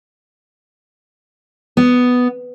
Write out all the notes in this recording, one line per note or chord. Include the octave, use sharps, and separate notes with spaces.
B3